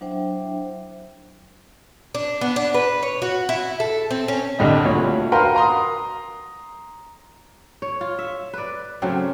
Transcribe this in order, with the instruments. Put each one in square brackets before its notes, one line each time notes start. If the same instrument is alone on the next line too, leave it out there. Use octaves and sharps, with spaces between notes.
[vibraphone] F#3 D4 E4 C5 E5 G5
[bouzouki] D4
B3
D4
B4
C#5
F#4
E4
A4
C4
C#4
[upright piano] C2 D3 G3 G4 D#5
D2 A#2 C#5
F#4 A#4 B4 F5 G5 C6
A#5 C6 D#6
[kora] C#5
F4
E5
B4 D5
C#3 F#3 A3 C4